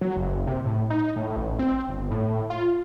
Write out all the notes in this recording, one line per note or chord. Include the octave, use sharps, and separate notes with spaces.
F#3
F#1
C3
A2
D#4
A2
A1
C4
G1
A2
F4